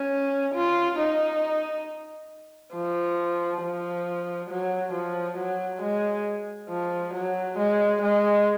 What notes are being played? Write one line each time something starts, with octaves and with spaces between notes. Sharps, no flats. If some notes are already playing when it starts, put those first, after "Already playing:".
Already playing: C#4
F4
D#4
F3
F3
F#3
F3
F#3
G#3
F3
F#3
G#3
G#3